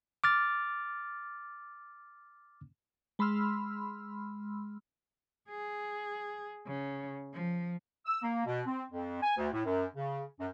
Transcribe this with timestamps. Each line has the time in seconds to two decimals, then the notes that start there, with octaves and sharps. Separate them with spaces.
0.24 D6 F6 A6
3.19 G#3 B5 C6 E6 F6
5.49 G#4
6.67 C#3
7.34 F3
8.06 E6
8.22 A#3
8.46 B2
8.67 C4
8.91 F2
9.22 G#5
9.37 D2
9.53 A2
9.65 F#2
9.95 C#3
10.39 F#2